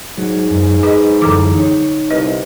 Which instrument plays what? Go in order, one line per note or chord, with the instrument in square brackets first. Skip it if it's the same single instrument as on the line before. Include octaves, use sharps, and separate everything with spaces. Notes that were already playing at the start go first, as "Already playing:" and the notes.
[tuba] G#2 [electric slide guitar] F#3
[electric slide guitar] F#2
[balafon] G#4 D#5 [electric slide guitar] B4
[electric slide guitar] F#2 E3 [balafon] D3 A4 D6
[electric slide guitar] D#4 C#5
[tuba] C2 [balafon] B4 D#5